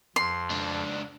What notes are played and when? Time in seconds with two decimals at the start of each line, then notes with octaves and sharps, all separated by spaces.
0.16 F2 C6
0.51 C#2 D4